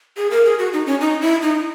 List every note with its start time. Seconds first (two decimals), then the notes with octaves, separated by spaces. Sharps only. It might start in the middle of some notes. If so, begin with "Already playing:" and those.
0.17 G#4
0.31 A#4
0.45 G#4
0.59 F#4
0.73 D#4
0.86 C#4
1.01 D#4
1.21 E4
1.42 D#4